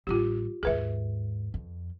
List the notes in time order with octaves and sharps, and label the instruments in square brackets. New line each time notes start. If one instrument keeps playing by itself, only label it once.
[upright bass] A1 G3 [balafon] F4 G4
[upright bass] D#2 G#2 [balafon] G#4 B4 E5
[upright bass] F2